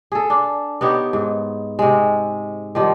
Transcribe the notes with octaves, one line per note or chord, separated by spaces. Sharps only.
G#4 A4
D4
B3 D#4 G4 C#5
G#2
C3 G#3
D#3 F3 G3